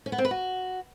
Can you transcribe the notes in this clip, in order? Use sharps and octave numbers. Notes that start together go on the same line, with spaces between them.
C#4
B3
C4
B4
F#4